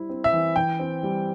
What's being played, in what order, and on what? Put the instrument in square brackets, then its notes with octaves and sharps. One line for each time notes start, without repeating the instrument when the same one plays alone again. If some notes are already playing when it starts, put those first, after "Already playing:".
Already playing: [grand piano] G3 E4 C5
C4
[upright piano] E5
[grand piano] E3
[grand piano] E3 [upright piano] G5
[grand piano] C4
G3